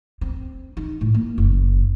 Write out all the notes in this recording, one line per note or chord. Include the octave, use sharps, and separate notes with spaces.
C4
D#4
A2
A#3
F#1